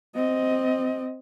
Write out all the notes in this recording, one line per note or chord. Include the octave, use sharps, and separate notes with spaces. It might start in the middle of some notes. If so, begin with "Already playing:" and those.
C4 D#5